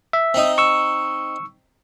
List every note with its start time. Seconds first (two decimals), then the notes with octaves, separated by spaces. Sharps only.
0.13 E5
0.34 C4 D#4
0.58 C#6 E6